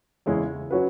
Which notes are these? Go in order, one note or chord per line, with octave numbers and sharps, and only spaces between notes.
E2 C#3 G#3 C#4 E4
F#3 C#4 F#4 B4